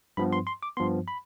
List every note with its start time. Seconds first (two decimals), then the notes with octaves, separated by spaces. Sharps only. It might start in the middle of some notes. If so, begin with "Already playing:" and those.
0.17 G2 F3 B3 B5
0.33 C6
0.47 C6
0.63 D6
0.77 G2 F3 B3 C6
1.08 B5